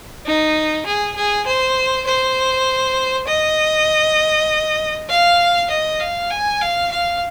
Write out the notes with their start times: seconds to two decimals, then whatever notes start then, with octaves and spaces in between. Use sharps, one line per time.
0.25 D#4
0.86 G#4
1.16 G#4
1.46 C5
2.07 C5
3.28 D#5
5.09 F5
5.70 D#5
6.00 F5
6.30 G#5
6.61 F5
6.91 F5